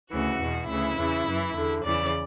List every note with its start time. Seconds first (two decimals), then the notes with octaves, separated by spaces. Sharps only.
0.11 D2 C#3 E3 F#4
0.40 E2 B2
0.69 D2 C#3 E3 E4
0.97 E2 C#3 E3
1.26 F#2 E3
1.54 E2 D3
1.83 E2 C#3 E3 D5